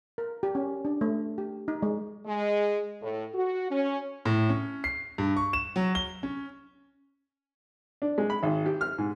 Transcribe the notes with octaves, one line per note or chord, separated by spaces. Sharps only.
A#4
G4
C#4
D4
A3
G4
D#4
G#3
G#3
A2
F#4
C#4
A2
C#4
C7
G2
C#6
E7
F#3
G7
C#4
D4
G#3
B5
G#1
G4
F6
G#2